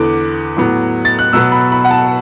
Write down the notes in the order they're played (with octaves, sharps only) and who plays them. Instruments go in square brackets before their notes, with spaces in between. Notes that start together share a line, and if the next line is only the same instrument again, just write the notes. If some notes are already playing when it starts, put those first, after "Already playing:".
Already playing: [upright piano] E2 D3 B3 D6
A2 F#3 B3
A6
F#6
B2 F#3 B3 E6
B5
B5
F#5
A5